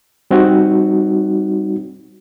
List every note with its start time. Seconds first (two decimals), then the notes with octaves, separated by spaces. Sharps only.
0.31 G3 C4 D#4 F#4